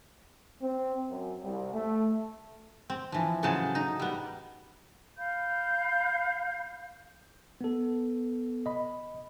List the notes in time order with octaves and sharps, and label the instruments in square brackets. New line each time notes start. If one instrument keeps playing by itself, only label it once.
[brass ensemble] C4
F#2
C2
A3
[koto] C4
E3 F3
A2 C#3 F#3 G#4 C5 A5
D#4
G3 B3
[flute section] F5 B5 G6
[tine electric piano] B3 A4
D#5 B5